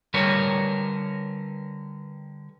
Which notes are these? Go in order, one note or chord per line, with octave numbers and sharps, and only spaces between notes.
D3 G3 A#4 B4 C#5